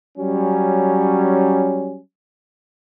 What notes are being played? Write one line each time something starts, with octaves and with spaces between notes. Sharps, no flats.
F#3 G3 C#4